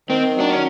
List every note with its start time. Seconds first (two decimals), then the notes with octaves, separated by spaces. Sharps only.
0.09 D#3 C4
0.36 F#3 D4
0.50 C#4